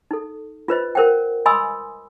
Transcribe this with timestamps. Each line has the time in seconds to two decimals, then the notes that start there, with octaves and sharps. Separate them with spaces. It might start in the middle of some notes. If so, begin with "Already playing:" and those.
0.11 D#4 A4
0.68 F4 B4 C5 D#5
0.95 A#4 C5 F#5 G5
1.46 D#5 G#5 B5 C6 D#6 E6